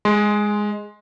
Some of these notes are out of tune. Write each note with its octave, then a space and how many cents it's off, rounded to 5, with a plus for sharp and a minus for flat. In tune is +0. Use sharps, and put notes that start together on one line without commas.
G#3 +0 C6 +0